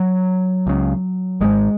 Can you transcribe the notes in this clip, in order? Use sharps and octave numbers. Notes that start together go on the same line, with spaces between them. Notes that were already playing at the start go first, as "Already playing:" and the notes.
Already playing: F#3
C#2 C#3
G#1 G#2 G#3